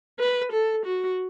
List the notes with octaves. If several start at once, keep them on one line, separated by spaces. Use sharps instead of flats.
B4
A4
F#4